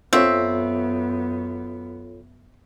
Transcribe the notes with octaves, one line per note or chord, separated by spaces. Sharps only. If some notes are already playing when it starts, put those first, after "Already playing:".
F#2 B3 C4 F4 A4 C#5 E5